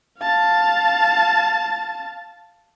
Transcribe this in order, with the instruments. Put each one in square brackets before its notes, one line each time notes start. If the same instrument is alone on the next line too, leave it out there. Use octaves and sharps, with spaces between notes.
[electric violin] F5 A5